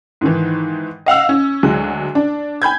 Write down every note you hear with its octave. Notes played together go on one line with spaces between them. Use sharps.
G#2 D#3 E3
D#5 F5 F#5 E6
C#4
D2 F#3 G#3 F#6
D4
G#5 B5 G6 G#6